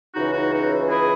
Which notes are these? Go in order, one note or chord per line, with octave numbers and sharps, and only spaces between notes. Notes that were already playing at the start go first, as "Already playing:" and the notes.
C#2 C#3 E3 D#4 F#4
D#4 F#4
D#4 F#4
E4 G#4